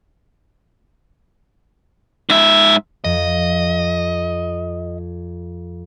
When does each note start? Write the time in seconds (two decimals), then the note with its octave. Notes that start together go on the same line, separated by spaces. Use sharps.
2.30 G#2 E5
3.04 F2 D#5